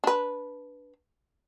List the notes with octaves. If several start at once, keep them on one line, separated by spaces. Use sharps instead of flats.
D4 B4